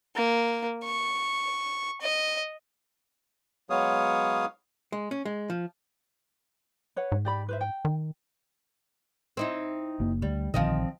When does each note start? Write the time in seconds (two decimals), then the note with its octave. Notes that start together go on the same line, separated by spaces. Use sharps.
0.16 A#3
0.85 C#6
2.01 D#5
3.70 F#3 G#3 B3 C#5 F5 D#6
4.92 G#3
5.11 C#4
5.25 G#3
5.50 F3
6.96 B4 C#5 F#5
7.12 G#2
7.25 G4 D5 B5
7.49 B4 C5 E5
7.61 G5
7.85 D#3
9.37 C4 D#4 E4
10.00 F#1 F#2 A#3
10.22 D2 G3
10.54 A#1 D3 D#3 F3 C4 D#5